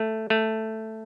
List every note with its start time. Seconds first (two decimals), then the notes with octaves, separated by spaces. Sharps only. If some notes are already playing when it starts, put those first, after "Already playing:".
Already playing: A3
0.30 A3